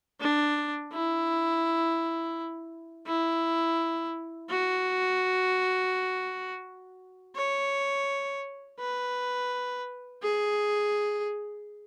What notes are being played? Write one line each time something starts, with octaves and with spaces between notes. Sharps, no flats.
D4
E4
E4
F#4
C#5
B4
G#4